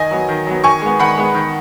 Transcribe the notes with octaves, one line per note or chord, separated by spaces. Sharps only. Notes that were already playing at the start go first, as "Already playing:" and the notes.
Already playing: D#3 D#5 G#5
F#3 B3
D#3
F#3 B3
D#3 G#5 C#6
G#3 B3
D#3 F#5 B5
G#3 B3
D#3